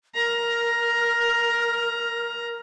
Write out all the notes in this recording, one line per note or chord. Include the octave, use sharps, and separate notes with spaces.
A#4 A#5